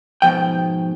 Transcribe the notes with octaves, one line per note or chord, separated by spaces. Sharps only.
G#2 B2 F3 G5